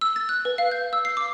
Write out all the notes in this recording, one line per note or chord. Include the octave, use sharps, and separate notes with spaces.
E6
A6
F#6
B4
F5
G6
E6
C7
D6